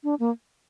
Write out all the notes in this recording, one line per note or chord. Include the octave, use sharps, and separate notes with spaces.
D4
A#3